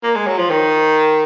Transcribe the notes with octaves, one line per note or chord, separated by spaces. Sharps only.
A#3
G#3
F#3
F3
D#3